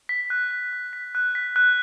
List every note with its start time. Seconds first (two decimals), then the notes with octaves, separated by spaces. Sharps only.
0.09 B6
0.30 F#6
0.51 F#6
0.73 F#6
0.93 B6
1.15 F#6
1.35 B6
1.56 F#6